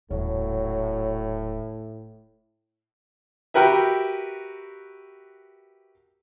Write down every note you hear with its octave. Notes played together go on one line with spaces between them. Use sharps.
D#1 A2 F#3
F#4 G4 A#4 B4 E5